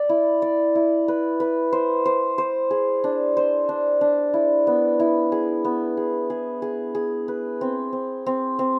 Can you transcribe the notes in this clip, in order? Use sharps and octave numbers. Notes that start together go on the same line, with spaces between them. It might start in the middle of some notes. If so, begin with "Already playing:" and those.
Already playing: D5
E4
D5
E4
B4
B4
C5
C5
C5
G#4
D4
C5
D4
D4
E4
B3
E4
G#4
B3
G#4
G#4
G#4
G#4
B4
C4
C4
C4
C4